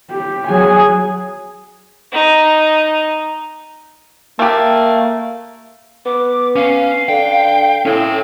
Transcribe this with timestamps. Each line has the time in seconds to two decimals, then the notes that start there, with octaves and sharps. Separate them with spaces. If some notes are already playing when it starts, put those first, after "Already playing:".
0.10 G4
0.48 F#3 G#4 G#5
2.12 D#4
4.39 A3 A#3 G4
6.06 B3 D6
6.56 C#4 F5
7.09 D3 G5
7.85 A2 C#4 G5